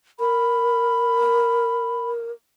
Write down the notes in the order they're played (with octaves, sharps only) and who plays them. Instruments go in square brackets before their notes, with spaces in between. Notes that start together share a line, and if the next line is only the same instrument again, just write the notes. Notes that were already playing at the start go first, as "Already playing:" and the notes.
[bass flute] A#4 [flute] B5